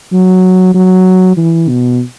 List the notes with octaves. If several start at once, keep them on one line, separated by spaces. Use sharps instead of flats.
F#3
F#3
E3
B2